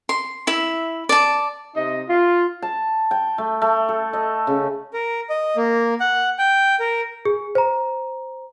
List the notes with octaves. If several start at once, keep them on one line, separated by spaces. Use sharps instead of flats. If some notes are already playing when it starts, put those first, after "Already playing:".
C6
E4 E5
D5 A5
C3 D#4 D#5
F4
A5
G5
A3
A3
A4
D#5
C#3
A#4
D#5
A#3
F#5
G5
A#4
G#4
C5 A#5